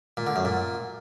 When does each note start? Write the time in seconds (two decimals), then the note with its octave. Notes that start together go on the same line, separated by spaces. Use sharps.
0.17 A#2
0.27 D3
0.36 F#2
0.45 A#2